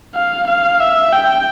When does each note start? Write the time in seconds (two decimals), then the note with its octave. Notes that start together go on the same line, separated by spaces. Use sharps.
0.15 F5
0.47 F5
0.80 E5
1.12 G5